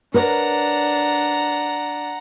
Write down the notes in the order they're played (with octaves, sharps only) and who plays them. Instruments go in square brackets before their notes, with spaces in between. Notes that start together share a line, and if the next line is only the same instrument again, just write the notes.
[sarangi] D4 [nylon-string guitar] A#4 B4 C#5 [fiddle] F#5 A#5